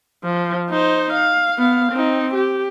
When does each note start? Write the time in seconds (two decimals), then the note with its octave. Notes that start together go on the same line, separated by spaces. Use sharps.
0.24 F3
0.70 D#4 C5
1.13 F5
1.58 B3 F5
1.92 C4 D#4
2.35 G4